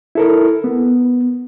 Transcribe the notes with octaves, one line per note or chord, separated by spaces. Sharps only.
E4 A4 A#4
B3